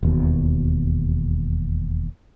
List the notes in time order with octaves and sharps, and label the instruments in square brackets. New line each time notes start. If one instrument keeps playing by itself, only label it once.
[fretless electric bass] E1 D#2 B2